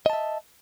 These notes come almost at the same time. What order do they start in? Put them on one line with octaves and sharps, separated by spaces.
D#5 A5 E5